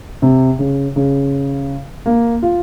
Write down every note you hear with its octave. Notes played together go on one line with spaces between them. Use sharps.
C3
C#3
C#3
A#3
F4